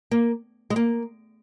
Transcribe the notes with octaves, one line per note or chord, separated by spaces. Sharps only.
A#3
G#3
A#3